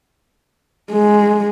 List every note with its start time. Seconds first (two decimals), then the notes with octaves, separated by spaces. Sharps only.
0.92 G#3